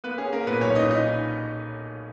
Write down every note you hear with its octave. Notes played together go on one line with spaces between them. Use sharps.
A#3 B3 B4
C#4 G#4
A#3 C#4 A#4
A#2 B3 B4
B1 C#4 C#5
A#2 D#4 D#5
D#4 D#5